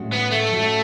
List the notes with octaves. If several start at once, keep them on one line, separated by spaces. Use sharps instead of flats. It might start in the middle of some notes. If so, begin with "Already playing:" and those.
Already playing: A2 G#3 C#4 F#4
B3
A3
A2 G#3 C#4 F#4